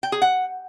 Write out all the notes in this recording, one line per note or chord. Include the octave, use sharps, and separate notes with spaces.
G5
G#4
F#5